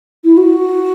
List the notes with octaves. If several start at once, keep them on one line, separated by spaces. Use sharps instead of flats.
E4
F#4